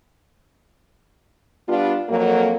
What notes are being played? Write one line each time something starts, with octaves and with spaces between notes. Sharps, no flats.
G3 B3 D4 F4
F2 F#3 A#3